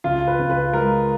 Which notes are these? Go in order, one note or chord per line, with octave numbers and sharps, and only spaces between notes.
C#2 F4
B4
C#2
B4
G#3 A#4